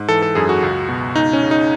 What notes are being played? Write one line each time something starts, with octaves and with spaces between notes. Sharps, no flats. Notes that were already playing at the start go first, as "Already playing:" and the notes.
Already playing: G#2
E3 A4
A4
F#2 G#4
F#4
C#2
B2
C#2 D#4
C#4
C#3
D#4